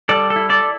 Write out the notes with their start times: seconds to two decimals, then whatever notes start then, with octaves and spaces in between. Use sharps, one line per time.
0.09 G3 A4 D5
0.30 A4
0.36 E4
0.50 A4 D5